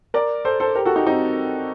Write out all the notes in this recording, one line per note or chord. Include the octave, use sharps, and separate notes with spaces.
A#4 D5
A4 C5
A4 C5
G4 A#4
F#4 A4
D#4 G4
C4 D#4